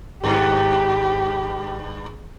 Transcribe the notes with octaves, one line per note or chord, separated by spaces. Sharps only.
G#1 G2 B3 G4 G#4